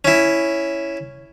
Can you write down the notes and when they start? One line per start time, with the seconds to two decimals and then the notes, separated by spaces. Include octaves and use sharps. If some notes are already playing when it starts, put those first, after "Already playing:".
0.05 C#4 E4